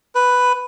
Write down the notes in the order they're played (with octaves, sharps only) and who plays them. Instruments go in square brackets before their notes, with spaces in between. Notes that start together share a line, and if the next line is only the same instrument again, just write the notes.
[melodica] B4